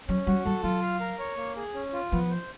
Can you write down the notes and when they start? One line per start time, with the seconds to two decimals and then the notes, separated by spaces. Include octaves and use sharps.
0.08 F#3 C#4
0.27 G3 F#4
0.46 G3 A4
0.63 F#3 F4
0.82 F5
1.00 A#4
1.19 C#5
1.37 A#3
1.56 G#4
1.74 C#4
1.93 F4
2.12 F3 B3
2.31 C5